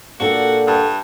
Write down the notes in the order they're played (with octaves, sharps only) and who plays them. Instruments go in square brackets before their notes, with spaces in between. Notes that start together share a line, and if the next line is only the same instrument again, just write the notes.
[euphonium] A#2 [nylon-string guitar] D4 G4 A4 [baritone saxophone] F#4 [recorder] F#5
[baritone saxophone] G2